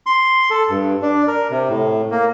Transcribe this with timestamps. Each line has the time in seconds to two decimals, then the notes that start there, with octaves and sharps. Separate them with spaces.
0.06 C6
0.50 A4
0.69 G2
1.02 D4
1.27 A#4
1.50 C3
1.69 A2
2.11 A#3